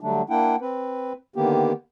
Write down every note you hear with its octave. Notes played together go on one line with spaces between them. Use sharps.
D3 F#3 G3 A3 D4
A#3 D4 E4 F#5 G5
C4 B4
D3 D#3 A#3 B3 G4